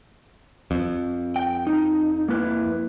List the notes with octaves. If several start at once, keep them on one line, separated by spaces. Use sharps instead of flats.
F2
G5
D#4
A#3 E4 B4